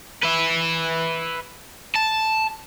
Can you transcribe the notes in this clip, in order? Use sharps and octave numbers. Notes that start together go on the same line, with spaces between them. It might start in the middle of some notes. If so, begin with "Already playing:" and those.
B4 E5
A5